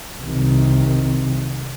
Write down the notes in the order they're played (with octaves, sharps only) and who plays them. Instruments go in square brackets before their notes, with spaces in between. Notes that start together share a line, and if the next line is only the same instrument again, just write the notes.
[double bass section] C2 C3 D#3